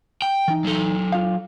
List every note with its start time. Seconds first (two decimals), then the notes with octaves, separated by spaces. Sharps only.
0.22 G5
0.48 E3 D#4
0.65 F#3 A4
1.12 F4 F5